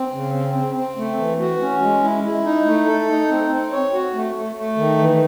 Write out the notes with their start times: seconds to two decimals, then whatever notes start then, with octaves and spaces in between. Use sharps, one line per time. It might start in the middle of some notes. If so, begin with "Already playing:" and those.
Already playing: C4
0.13 C#3
0.34 C4
0.56 C4
0.76 C4
0.97 A3
1.18 E3
1.40 F#4
1.61 C#4
1.82 G#3
2.03 E4
2.24 E4
2.45 D#4
2.66 A3
2.87 A4
3.08 D#4
3.29 C4
3.51 C4
3.71 C#5
3.93 F#4
4.14 A3
4.35 A3
4.56 A3
4.77 D#3
4.98 E3